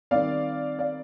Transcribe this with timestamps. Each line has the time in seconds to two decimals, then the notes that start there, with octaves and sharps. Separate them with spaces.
0.11 D#3 G3 C4 D5 F5
0.79 D5 F5